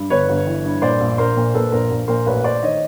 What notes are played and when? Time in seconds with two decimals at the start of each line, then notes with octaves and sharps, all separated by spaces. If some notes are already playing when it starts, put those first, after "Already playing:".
Already playing: G2
0.10 G1 B4 C#5
0.29 G1
0.47 E3
0.64 G2
0.82 A#2 C5 D5
1.00 A#1
1.18 A#1 A#4 C5
1.37 A#2
1.54 A#2 A4 B4
1.72 A#1 A#4 C5
1.91 A#1
2.08 A#2 A#4 C5
2.26 A1 B4 C#5
2.44 A1 C5 D5
2.62 D#3 C#5 D#5